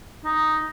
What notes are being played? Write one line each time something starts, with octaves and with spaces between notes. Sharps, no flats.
D#4